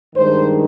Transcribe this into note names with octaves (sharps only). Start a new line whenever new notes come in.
G2 D#3 G#3 C5